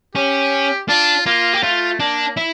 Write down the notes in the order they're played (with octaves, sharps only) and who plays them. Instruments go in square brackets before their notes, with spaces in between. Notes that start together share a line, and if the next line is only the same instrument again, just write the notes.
[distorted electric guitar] C#4 [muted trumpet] G4
[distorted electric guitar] D4 [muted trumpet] F4
[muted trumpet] A#3 [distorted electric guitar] F4
[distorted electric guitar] G4
[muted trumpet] A3 [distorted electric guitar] F4
[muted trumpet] A#3 [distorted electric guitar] D4
[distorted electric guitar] E4